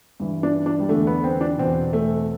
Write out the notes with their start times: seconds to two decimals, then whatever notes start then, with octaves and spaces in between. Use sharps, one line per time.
0.20 G2 E3
0.43 D4
0.66 D4
0.80 G3
0.89 E2 D3 A3
1.07 B3
1.24 C4
1.41 D4
1.58 E2 B2 C4
1.93 A3